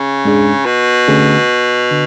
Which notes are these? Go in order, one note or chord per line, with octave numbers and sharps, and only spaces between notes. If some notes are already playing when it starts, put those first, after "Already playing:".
Already playing: C#3
G#2 G#3 D4 G#4
B2
D3 A3 C#4 G#4
D3